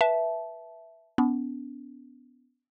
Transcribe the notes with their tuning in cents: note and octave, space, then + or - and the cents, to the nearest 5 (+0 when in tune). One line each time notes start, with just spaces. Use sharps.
B4 -15 E5 +0 A5 -15
B3 +15 D4 -40